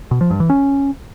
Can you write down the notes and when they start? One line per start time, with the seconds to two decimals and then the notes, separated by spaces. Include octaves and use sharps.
0.11 B2
0.21 F3
0.30 G2
0.40 E3
0.50 C#4